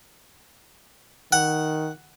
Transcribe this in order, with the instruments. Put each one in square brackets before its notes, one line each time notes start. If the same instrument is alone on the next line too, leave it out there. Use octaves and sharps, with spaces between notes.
[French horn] D#3 [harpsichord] F#5